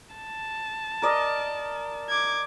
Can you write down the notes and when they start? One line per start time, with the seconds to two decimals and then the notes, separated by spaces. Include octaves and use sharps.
0.15 A5
1.02 A#4 D5 D#5
2.09 D6 G#6